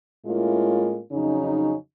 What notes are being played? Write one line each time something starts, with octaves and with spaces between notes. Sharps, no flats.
A2 G#3 A#3 C#4 E4 F4
F2 C#3 F#3 C#4 D#4